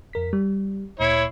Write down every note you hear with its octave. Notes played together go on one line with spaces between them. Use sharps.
F2 A#4 B6
G3
D2 A#2 E4 C#5 C7